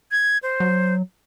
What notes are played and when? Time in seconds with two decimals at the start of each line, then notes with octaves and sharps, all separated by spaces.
0.11 G#6
0.43 C5
0.60 F#3